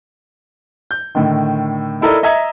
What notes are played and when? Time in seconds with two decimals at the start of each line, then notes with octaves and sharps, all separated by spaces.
0.91 G6
1.15 A2 D3 D#3
2.01 D#4 E4 A4 A#4 D5 D#5
2.23 D#5 E5 A#5 G#6